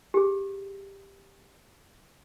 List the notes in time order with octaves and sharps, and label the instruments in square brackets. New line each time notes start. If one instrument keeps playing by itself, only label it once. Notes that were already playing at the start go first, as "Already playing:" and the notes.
[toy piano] G4 G#4